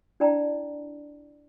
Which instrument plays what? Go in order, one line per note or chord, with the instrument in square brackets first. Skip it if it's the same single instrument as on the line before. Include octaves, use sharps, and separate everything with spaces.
[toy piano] D4 E4 D5 G5 A5 A#5